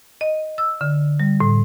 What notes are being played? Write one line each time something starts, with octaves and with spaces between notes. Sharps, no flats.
D#5
E6
D3
G3
A2